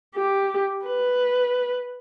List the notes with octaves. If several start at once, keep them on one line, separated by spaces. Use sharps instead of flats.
G4
B4